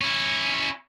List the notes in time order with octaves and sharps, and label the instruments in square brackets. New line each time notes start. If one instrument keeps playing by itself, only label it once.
[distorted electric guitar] C#4 E4